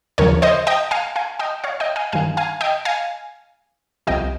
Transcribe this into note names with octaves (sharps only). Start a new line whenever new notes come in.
D#2 C#3 F3 A#4 C#5
C5 D#5
D#5 G5
F5 G#5
F5 G#5
D#5 G5
C#5 F5
D#5 G5
F5 G#5
G2 D#3 F5 G#5
F5 G#5
D#5 G5
F5 G#5
C2 C3 F3 D#5 G5